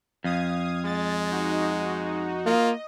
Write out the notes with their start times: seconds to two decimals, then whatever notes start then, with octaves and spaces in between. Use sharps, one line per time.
0.24 F2 F5 D#6 G#6
0.85 G#3 A6
1.31 D#4 F#4
2.46 A#3 F4 D#5